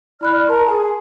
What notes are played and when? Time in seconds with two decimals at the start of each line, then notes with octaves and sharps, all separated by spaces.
0.21 E4 D5 B5 F6 F#6
0.48 A#4 A5 C6
0.65 G#4